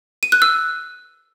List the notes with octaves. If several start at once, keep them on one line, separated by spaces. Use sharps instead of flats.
D#7
F#6
E6